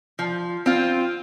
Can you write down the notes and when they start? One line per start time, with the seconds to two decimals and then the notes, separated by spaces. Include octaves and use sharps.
0.19 F3
0.66 C4 F4